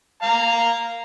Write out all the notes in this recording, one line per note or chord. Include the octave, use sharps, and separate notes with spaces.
F5 A#5